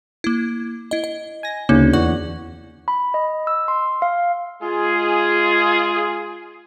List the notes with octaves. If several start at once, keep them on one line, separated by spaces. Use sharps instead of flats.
A#3 E4
E4 D#5
D#5
G#5 A#6
D2 C#3 A#3 D#4
E2 F#4 D5
B5
D#5
E6
C6
F5
G#3 F4 G#4